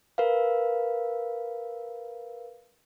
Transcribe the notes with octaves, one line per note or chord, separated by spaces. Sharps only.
A#4 B4 F5